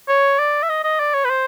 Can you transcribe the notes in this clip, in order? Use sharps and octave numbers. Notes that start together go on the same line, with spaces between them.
C#5
D5
E5
D#5
D#5
D5
C#5
B4
C5